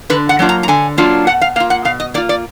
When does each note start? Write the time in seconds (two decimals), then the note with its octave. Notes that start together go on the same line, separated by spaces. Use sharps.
0.10 D3 B4
0.29 F#5
0.39 F#3 A#3 D4 F4
0.49 A#5
0.63 A#5
0.68 D3 G#5
0.97 F#3 A#3 D4 F4
1.27 B2 F#5
1.41 F5
1.56 A#3 F5
1.60 F4
1.70 F#5
1.85 B2 F5
2.00 D#5
2.14 A#3 D5
2.17 F4
2.29 D5